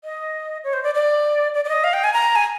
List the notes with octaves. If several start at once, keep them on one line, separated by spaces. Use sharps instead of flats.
D#5
C#5
C5
D5
D5
D5
D5
D#5
F5
G5
G#5
A#5
G#5